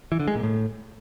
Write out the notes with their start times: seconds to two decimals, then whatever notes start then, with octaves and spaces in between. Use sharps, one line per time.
0.12 E3
0.20 D3
0.27 G#3
0.35 A#2
0.43 A2